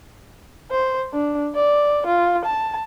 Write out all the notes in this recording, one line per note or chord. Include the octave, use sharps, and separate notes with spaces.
C5
D4
D5
F4
A5